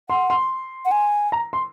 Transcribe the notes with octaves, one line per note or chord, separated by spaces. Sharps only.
F#5 C6
C6
F#5
G#5
A#5
C6